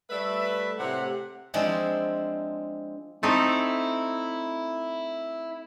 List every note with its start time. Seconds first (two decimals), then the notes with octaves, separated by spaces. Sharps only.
0.10 G3 A3 B4 E5
0.78 A2 C3 F#5
1.54 F3 G#3 C4 D4 E4
3.23 A3 C4 D#4 E4